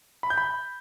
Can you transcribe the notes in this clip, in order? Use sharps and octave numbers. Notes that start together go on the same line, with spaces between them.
B5
G6
B5